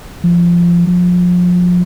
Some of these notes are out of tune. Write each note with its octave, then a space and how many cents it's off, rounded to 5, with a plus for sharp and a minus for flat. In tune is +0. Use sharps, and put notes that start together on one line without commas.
F3 -15
F3 +30